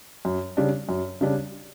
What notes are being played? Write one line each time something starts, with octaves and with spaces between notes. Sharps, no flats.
F#2
C#3 G3 D4
F#2
C#3 G3 D4